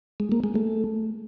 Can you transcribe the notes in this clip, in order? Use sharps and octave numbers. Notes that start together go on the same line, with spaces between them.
G#3
A#3
G#3
A3